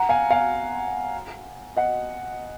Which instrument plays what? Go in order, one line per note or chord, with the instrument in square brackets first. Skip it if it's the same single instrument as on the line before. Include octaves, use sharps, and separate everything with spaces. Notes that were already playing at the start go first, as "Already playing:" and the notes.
Already playing: [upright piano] F#5 A#5
F5 G#5
F5 G#5
D#5 F#5